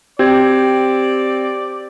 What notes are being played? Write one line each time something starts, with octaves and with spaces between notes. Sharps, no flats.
C4 G4 D5 G#6